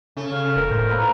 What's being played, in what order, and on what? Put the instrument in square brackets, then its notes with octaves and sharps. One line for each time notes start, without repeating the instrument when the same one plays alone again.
[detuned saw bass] C#3 [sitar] A3
[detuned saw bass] C#3 [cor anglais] F5
[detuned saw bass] E1 [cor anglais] A#4
[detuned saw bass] A2 [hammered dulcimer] C5
[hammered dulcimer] A#3 B4 E5